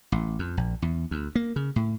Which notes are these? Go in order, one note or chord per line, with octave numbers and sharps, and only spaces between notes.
A1
F2
A#1
E2
D2
A#3
C#3
A2